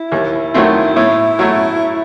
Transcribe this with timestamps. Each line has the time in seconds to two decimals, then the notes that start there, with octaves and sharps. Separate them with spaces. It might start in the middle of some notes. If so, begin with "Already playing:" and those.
Already playing: E4
0.12 D#2
0.54 D#3 F#3 A3 C4
0.96 A2
1.39 F#3 A3